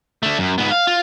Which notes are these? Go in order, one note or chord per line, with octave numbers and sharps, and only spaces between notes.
D3 A3
F#2
G#2 B3
F5
F4